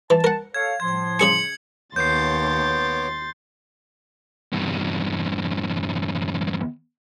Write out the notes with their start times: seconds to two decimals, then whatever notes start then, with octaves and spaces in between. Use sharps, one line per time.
0.10 E3 A5
0.24 A#4 F#5
0.54 A4 C#5 F5 G#6
0.80 A2 F3 C6 G#6
1.19 C#3 G#4 G#5 C#7 F#7
1.96 D#2 B3 C#5 C6 D6 G6 A6 C7
4.53 E2 G2